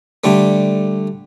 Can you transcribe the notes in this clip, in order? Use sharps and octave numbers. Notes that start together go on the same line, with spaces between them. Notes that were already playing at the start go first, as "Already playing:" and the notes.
D3 G3 A3